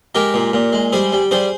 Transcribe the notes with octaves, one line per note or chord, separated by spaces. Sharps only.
G#3 G4 A#4
A#2
A#2
G#3
G3 G#4 C5
G3
G3 G#4 C5